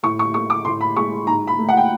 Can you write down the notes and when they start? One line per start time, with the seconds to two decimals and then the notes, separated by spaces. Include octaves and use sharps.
0.03 A2 C#6
0.19 C#6
0.34 A3 C#6
0.50 D6
0.65 A2 C6
0.81 B5
0.96 G#3 C#6
1.27 G#2 A#5
1.47 B5
1.58 A3
1.69 F#5
1.77 G5